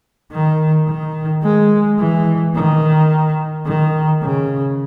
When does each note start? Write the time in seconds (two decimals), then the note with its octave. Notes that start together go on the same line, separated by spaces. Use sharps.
0.32 D#3
0.88 D#3
1.43 G#3
1.99 E3
2.55 D#3
3.67 D#3
4.22 C#3